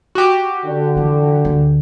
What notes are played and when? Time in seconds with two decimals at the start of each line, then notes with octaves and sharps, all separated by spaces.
0.15 F#4 G4
0.65 D3
0.96 E2 F3
1.45 D2